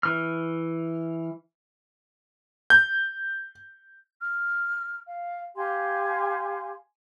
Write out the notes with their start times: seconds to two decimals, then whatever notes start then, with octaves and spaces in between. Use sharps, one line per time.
0.03 E3 F6
2.70 G6
4.20 F6
5.07 F5
5.55 G4 F5 G#5 C6